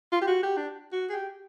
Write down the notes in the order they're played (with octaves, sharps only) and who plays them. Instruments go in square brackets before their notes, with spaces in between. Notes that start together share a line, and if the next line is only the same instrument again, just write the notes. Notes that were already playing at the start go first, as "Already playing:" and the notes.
[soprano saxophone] F4
G4
F#4
G4
D4
F#4
G#4
G4